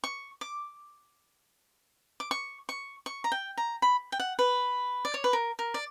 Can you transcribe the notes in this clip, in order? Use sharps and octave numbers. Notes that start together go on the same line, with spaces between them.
C#6
D6
D6
C#6
C#6
C#6
A#5
G5
A#5
B5
G5
F#5
B4
D5
C#5
B4
A#4
A#4
D5